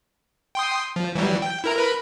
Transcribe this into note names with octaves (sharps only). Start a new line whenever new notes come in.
G5 C6 D#6
F3
E3 F#3 G3
G5
E4 A#4 A#5
A#4 B4 B5